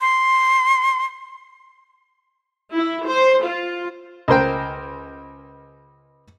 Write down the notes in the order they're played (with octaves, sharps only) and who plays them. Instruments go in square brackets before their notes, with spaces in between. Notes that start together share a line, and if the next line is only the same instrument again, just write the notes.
[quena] C6
[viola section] E4
C5
F4
[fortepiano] C#2 A#4 C5 G5